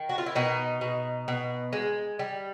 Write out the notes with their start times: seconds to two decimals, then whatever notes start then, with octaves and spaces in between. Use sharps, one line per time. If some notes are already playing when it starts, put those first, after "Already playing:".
Already playing: D#3
0.09 F#4
0.18 F4
0.26 E4
0.35 B2 D#4
0.81 B2
1.28 B2
1.73 G#3
2.19 G3